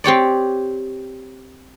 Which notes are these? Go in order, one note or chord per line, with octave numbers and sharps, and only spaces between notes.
C4 G4 C#5 D5